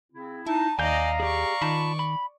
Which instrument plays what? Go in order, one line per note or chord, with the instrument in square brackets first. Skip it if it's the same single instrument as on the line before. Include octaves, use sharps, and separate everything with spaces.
[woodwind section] C#3 C4 E4
[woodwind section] D#4 [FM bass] E4 [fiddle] A5
[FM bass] D#2 [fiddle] D5 D#5 [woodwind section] F5 A#5 [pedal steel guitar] G#5 G6
[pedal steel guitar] G4 G#4 [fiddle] D5 C#6
[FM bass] D#3 [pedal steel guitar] F4 A5 B5
[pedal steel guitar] B5